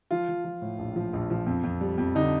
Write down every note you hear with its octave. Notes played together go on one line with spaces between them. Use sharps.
F3 F4
F3
F3
A2
A#1
F3
A#1
F3
F2
F2
G3
F2
D3 D#4